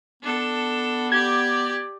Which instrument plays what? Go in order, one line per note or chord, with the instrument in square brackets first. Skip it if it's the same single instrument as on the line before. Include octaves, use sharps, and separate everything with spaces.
[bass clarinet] B3 [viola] D4 A4
[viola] G4 D5 [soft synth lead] G#6